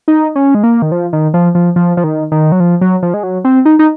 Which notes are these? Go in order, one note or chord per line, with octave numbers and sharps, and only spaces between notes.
D#4
C#4
G#3
A#3
D#3
F3
D#3
F3
F3
F3
F3
D#3
D#3
F#3
F3
F#3
F3
G#3
F#3
C4
D#4
D#4